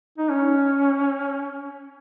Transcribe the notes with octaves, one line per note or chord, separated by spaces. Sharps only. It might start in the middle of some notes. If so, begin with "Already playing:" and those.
D#4
C#4